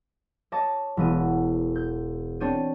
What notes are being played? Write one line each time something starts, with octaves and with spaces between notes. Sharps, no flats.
C#5 D#5 A5 D6
E1 B3 D#7
G6
C4 D4 C#5 G6 D#7